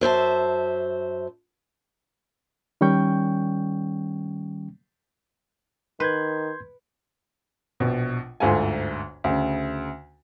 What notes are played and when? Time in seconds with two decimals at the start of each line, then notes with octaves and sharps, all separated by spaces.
0.01 F#2 C5 E5 A5
2.81 D#3 G3 C#4 G5 C#6 G6
6.00 D#3 B4 C6 G6 G#6
7.80 A#1 B2
8.40 G1 D2 G#2 F4 A4 G#5
9.24 D2 C#3